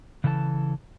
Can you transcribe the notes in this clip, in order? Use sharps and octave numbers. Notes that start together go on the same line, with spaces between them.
C#3 E3 A4 D#5 A5